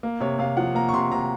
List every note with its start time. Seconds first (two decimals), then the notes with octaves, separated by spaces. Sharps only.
0.03 A#3
0.20 C3 C#5
0.39 C3 F5
0.57 F3 F#5
0.75 A#3 A#5
0.89 C#6
0.93 C3 C6
1.12 C3 A#5